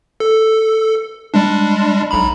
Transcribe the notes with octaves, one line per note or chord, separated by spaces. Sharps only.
A4
G3 G#3 D4
B1 A#5 B5